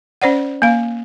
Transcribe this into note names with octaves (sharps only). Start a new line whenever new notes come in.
C#4 C5 D5 F#5
A#3 F5